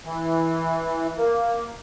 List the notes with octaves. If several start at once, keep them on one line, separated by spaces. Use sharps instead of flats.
E3
A#3